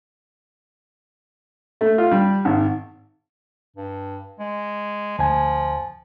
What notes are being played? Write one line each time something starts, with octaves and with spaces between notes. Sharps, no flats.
A3
F4
G3
G#1
G2
G#3
D2 F3 G#5